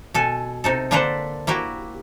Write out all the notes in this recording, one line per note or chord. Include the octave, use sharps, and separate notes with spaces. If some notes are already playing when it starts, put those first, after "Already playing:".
B2 A4 G#5
C3 D#4 A4
D3 A#3 D4 A4 B4 C5
A#3 E4 F#4 G4